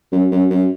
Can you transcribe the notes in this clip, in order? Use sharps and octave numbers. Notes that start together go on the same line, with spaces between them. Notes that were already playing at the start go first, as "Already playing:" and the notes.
F#2
F#2
F#2